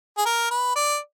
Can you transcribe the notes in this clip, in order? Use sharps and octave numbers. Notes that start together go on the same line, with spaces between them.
G#4
A#4
B4
D5